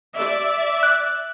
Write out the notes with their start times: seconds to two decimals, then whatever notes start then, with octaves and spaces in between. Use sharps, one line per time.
0.16 D5 E5
0.83 F#6